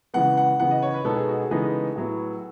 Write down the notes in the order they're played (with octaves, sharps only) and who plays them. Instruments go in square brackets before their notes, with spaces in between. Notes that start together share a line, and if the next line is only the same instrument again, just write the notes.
[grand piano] C#3 E3 G#3 B3 [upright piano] F#5
[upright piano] F#5
[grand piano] C#3 E3 B3 [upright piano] F#5
[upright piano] D#5
C#5
B4
[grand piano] B2 G#3 B3 D#4 [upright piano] A4
[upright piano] G#4
F#4
G#4
[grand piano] C#3 E3 G#3 B3 D#4 [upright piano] G#4
[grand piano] A2 F#3 B3 E4